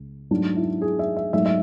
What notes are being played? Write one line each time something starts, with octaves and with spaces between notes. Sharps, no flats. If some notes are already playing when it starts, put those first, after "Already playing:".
Already playing: C#2
G#2 F#3 A3 D4
E4
G#4
E5
E5
G#2 F#3 A3 E5
E5